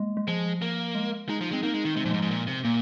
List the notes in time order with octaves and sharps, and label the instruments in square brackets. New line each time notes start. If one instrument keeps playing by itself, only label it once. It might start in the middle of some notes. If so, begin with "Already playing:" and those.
Already playing: [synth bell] G#3 A#3
G#3
[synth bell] F3 [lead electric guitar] G#3
[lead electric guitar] A#3
[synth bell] G#3
[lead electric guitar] G#3 [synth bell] D#4
[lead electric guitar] F3
[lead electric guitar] G#3 [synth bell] C4
[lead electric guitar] A#3 [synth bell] D#4
[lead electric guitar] G#3
D#3
[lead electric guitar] C3 [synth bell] G#3
[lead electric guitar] A#2 [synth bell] F3
[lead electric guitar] G#2 [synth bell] G#3
[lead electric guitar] G#2
A#2
C3
[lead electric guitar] A#2 [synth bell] A#3